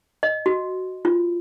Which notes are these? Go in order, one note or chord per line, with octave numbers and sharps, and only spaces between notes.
D#5
F#4
F4